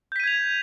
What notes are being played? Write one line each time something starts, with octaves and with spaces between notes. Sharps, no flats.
G6 G#6 B6 D#7 F7